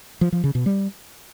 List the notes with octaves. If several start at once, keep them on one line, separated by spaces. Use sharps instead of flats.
F3
F3
C#3
B2
G3